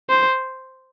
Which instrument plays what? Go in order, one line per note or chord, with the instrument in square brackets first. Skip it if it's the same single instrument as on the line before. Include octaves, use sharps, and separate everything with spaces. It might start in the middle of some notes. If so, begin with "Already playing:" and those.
[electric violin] C5